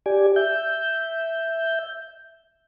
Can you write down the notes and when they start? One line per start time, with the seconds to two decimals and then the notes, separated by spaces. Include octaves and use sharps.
0.06 G4 D5 G#5
0.36 E5 G6